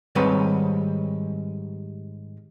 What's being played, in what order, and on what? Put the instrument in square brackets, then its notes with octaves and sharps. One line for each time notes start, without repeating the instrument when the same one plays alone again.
[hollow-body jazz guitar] G#2 D#3 G3 C4 B4 C#5